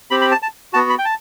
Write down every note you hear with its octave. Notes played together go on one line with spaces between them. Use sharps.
C4 G4 B5
B5
A5
A5
B3 F#4 A5
B5
G5
A5